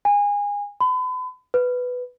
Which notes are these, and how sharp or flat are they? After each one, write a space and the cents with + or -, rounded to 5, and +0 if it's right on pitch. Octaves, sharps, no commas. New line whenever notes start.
G#5 -25
B5 +40
B4 +5